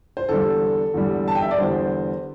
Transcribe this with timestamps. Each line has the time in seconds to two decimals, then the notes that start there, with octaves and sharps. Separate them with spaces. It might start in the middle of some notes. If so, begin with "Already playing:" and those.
0.17 C5
0.29 E2 D3 G3 A4
0.94 E2 D3 G3
1.28 A5
1.35 G5
1.42 E5
1.51 D5
1.58 E2 D3 G3 C5